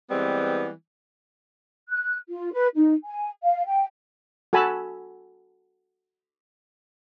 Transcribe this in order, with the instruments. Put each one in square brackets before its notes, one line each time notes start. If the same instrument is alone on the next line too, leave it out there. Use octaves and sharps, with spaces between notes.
[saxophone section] E3 G3 G#3 B3 C4
[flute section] F#6
F4
B4
D#4
G#5
F5
G5
[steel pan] F#4 A4 G#5 A5 B5